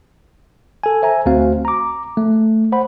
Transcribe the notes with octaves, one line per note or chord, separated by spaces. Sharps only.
A4 G#5
C5 E5 G#5 A#5
D2 A3 C4 F#4 C5 F5
A#5 D6
A3
C5 F#5 B5